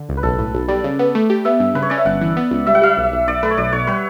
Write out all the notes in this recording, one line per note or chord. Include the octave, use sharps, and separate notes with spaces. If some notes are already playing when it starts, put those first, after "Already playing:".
Already playing: D3
C#2
B4
B1 A4
A2
B1
G3 D5
C#3
B3
A3
G4
B3 E5
G2
C#3 B4
C#5
C#4 D5
E5
G1 F#5
E3
B3
C#2
G3 E5
F#5
G3 E5
B1
B1
B1 D5
A3 B4
C#5
B1 D5
B1 C#5
G3 B4